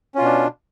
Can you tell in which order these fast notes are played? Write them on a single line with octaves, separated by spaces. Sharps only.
C#4 F4 B2 D4